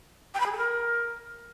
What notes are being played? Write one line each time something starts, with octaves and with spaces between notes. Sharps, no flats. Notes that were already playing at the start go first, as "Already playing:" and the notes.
G5
B5
G#4
A4
A#4